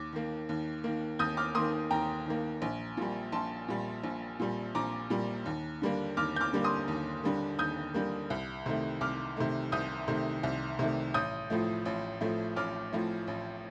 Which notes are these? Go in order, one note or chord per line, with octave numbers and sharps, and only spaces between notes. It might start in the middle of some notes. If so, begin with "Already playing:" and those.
Already playing: D#2 D6
D#3 A#3
D#2
D#3 A#3
D#2 D#6 G6
D6 F6
D#3 A#3 C6 D#6
D#2 G5 A#5
D#3 A#3
A#1
A#2 G3
A#1 A5 C6
A#2 G3
A#1
A#2 G3
A#1 A#5 D6
A#2 G3
D#2
D3 G3 A#3
D#2 D6 F6
G6
D6 F6
D3 G3 A#3
C6 D#6
D#2
D3 G3 A#3
D#2 D#6 G6
D3 G3 A#3
C2
C3 D#3 A3
C2 D6 F6
C3 D#3 A3
C2 D#6 G6
C3 D#3 A3
C2
C3 D#3 A3
A1 D#6 G6
A2 F3 A3
A1
A2 F3 A3
A1 D6 F6
A2 F3 A3
A1